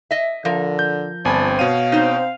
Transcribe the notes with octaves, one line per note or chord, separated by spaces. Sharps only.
D#5 E5
D3 F3 A#4
G6
G1 C4 D4 G#5 B5
B2 C#5 F5 D#7
C4 D#4 C5